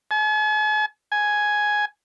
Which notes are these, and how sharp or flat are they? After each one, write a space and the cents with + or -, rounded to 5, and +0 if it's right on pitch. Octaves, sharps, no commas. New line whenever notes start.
G#5 +45
G#5 +5